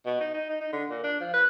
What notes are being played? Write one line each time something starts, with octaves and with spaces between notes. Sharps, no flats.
B2
D#4
D#4
D#4
D#4
D3
A#2
D4
F3
B4